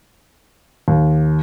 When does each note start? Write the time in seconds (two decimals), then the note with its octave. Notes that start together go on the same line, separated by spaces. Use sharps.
0.88 D#2